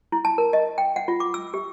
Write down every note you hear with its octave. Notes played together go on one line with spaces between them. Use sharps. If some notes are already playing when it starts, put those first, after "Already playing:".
E4
A5
A#4
D#5
G5
F#5
F4
D6
E6
G4